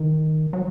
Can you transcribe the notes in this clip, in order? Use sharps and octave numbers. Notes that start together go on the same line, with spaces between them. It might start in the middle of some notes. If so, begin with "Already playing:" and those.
Already playing: D#3
F#3